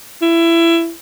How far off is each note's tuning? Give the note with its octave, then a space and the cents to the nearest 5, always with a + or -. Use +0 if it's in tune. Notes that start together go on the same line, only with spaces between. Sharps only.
E4 +20